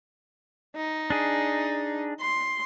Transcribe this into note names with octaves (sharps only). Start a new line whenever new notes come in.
D#4
D4 G#4
C6